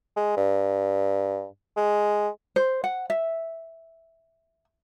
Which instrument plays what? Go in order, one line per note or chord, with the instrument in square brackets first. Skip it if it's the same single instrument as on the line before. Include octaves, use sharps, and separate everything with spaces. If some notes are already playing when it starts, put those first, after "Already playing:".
[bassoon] G#3
G2
G#3
[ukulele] C5
F#5
E5